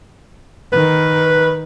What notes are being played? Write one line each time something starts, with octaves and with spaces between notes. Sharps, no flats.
D#3 B4